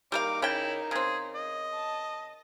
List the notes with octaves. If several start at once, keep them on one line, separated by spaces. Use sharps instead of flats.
G3 A#3 D#4 A#4 F5 D6
C#3 E4 G5
C#3 C4 G#4
D#5
A5